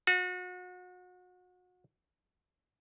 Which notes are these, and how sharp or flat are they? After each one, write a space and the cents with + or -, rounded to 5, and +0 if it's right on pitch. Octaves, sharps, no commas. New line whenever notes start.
F#4 -35